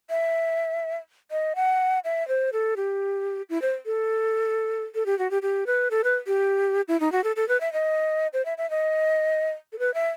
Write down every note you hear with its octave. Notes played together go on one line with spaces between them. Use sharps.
E5
D#5
F#5
E5
C5
A4
G4
E4
C5
A4
A4
G4
F#4
G4
G4
B4
A4
B4
G4
E4
D#4
F#4
A4
A4
B4
E5
D#5
C5
E5
E5
D#5
A4
B4
E5